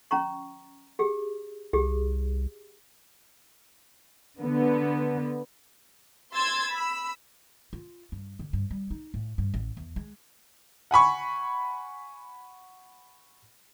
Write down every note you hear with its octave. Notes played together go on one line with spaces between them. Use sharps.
C#4 A#5 C#6
G4 G#4
C2 G4 G#4
D3 B3
C6 E6 G#6 A6
B5 E6
F4
G2
D3
G2
G3
D#4
A2
G2
A1
E2
G#3
F#5 G#5 B5 C#6